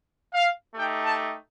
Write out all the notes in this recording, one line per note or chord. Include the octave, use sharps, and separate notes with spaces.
F5
A3 D#4 G4 G5
A5